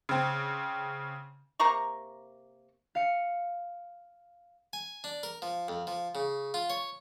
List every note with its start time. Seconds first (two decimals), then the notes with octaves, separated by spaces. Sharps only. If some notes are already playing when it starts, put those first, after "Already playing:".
0.09 C#3 C4
1.59 C3 A#3 A#5 C#6
2.95 F5 C#7
4.73 G#5
5.04 D4
5.23 A#4
5.42 F3
5.68 F2
5.87 F3
6.15 C#3
6.54 F4
6.70 C#5